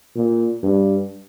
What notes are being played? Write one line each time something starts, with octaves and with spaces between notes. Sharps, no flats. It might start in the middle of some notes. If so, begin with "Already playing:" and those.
A#2
G2